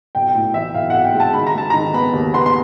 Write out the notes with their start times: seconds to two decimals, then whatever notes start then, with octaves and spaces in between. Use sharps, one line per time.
0.15 B1 G5
0.35 A2 G5
0.54 E3 E5
0.74 B1 F5
0.90 B1 F#5
1.04 G5
1.14 G#3
1.20 A5
1.34 D#3 B5
1.47 A#5
1.54 G#3 A5
1.70 D#3 A#5
1.94 B3 B5
2.13 D#2
2.34 B3 C6
2.46 C6